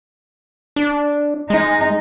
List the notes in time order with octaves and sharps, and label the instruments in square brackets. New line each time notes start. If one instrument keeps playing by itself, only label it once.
[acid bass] D4
[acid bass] G#3 [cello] D#4